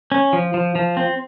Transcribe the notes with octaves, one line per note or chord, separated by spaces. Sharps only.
C#4
F3
F3
F3
C4